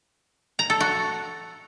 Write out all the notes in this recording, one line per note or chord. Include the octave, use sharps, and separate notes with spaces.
A#5
A4
F#4